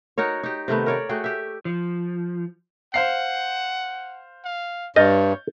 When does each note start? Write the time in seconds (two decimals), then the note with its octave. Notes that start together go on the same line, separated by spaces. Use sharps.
0.18 D#4 F#4 A#4 C#5
0.43 D#4 G4
0.68 C3 D#3 A3 B3
0.86 A#4 C#5 D5
1.09 A3 F#4 G#4 G5
1.24 G4 E5
1.65 F3
2.94 C5 F5 F#5 C7
4.45 F5
4.96 G2 C#5 D#5 F6 G6 A6